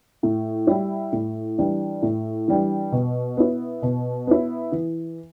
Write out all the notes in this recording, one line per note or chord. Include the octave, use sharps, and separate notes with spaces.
A2
G3 E4
A2
E3 G3 D4
A2
E3 G3 D4
B2
B3 E4
B2
B3 E4
E3